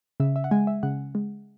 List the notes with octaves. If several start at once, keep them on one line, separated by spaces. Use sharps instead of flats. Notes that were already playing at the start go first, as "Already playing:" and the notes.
C#3 E5
E5
F#5
G#3 G#5
E5
C#3 F#5
G#3